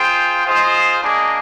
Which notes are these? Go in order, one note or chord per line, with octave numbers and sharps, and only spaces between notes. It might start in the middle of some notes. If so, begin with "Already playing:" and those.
Already playing: F4 G#4 C5 G5
F4 G#4 C5 D#5
A#3 D4 G#4 D#5